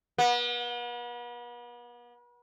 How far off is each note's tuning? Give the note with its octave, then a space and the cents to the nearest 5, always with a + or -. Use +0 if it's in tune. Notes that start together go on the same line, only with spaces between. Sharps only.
B3 -40